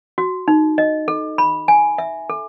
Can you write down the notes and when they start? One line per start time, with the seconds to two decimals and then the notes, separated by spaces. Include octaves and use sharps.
0.18 F#4
0.48 D#4
0.78 D#5
1.08 A4
1.38 B5
1.68 G#5
1.98 E5
2.30 A4